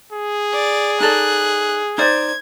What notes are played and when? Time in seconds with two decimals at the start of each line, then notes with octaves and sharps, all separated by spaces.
0.12 G#4
0.53 D5
1.00 D#4 A4 D5 F#6
1.98 D#4 C5 D5 G#6